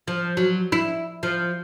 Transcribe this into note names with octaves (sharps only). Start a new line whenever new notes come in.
F3
F#3
E4
F3